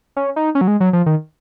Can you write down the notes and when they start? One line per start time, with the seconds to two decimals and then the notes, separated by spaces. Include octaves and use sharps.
0.16 C#4
0.36 D#4
0.55 C#4
0.61 F#3
0.68 G#3
0.80 F#3
0.93 F3
1.06 D#3